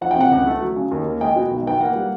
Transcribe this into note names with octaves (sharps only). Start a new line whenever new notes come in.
F3 F#5
G5
C3 F#5
C#2
A3
F#3
C#3
D#2
A#3
G#3 G5
B2
B1
B3 G5
A#3 F#5
G3